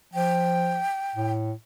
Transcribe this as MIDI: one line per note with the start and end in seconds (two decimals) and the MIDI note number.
0.14 0.82 53
0.14 1.33 79
1.16 1.52 45